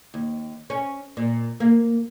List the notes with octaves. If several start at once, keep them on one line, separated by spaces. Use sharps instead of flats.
D#2
C#4
A#2
A#3